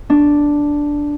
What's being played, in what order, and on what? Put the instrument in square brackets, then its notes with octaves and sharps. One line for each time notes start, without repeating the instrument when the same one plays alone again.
[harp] D4